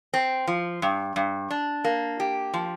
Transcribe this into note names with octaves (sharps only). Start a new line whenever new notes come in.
C4
F3
G2
G2
D4
A#3
G4
F3